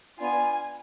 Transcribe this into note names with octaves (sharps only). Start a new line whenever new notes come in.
B3 D4 F4 G#5